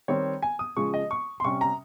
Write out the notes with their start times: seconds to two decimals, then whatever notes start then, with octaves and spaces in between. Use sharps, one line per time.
0.08 D#3 G3 C4 C#5
0.42 G#5
0.59 D#6
0.77 C#3 F3 G#3 C#6
0.94 D#5
1.11 C#6
1.40 C6
1.44 C3 G3 C#4 C#6
1.61 A#5